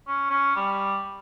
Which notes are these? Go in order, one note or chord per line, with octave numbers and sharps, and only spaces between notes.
C#4
C#4
G3